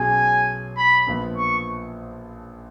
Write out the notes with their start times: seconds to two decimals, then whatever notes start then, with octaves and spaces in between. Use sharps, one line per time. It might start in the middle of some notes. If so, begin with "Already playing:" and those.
Already playing: B1 B2 F#3 C#4 G#4 G#5
0.77 B5
1.07 A#1 A#2 F3 B3
1.37 C#6